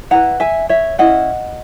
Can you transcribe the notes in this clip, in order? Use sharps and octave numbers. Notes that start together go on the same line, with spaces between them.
E4 G#4 B4 F#5 A#5
E5 G#5
C#5 E5
C#4 E4 B4 D#5 F#5